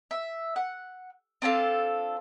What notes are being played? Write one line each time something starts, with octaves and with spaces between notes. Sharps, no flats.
E5
F#5
C4 D4 F4 A4